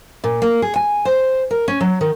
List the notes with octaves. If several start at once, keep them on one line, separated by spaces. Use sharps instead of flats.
A#2
A#3
G#4
G#5
C5
A#4
C#4
F#3
D#3